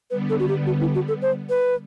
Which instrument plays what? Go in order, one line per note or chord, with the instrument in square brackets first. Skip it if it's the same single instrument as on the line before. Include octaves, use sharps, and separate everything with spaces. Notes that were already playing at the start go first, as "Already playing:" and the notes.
[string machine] D3 G3 B3 [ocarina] B4
[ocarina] A4
F#4
G4
F#4
E4
F#4
A4
C5
B4